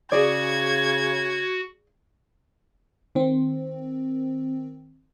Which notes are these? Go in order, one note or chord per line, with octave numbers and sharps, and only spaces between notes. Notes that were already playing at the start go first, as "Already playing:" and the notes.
C#3 F#4 G#4 D5 G#6
D#3 C4